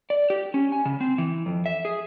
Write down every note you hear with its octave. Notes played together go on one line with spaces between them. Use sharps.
D5
G4
C#4
G#5
C#3
C4
E3
F2
E5
G#4